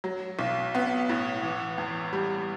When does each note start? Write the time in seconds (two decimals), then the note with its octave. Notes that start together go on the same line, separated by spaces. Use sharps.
0.04 F#3
0.39 B1
0.75 B3
1.09 A2
1.43 E3
1.78 E2
2.13 G3